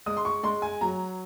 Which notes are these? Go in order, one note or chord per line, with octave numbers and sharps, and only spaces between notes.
G#3 D#6
C6
C#6
G#3 C6
G#5
F#3 A#5